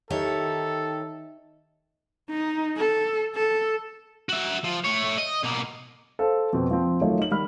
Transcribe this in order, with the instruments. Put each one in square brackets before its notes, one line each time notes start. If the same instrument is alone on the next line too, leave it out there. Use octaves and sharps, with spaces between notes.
[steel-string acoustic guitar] D#3 G4 C#5 [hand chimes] D#4 D#5 E5 [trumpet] A4
[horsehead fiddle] D#4
A4
A4
[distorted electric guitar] F#4 E5
F3
A3 C#5
D#5
B2 A#3
[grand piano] A4 C5 F5
F2 B2 C4
F3 C4
D#3 F#3 A3 F4 C#5 D#5
D#4 F#7
D#3 G3 B5 F6